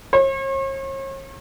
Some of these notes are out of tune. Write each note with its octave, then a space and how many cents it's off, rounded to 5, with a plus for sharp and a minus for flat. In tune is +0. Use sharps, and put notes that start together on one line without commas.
C#5 -45